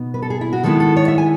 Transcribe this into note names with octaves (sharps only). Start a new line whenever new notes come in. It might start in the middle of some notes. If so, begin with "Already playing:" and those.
Already playing: B2 B3 D#4
B4
A4
G#4
E4
F#4
D#3 G#3 B3 E4 A4
A4
C#5
E5
G#5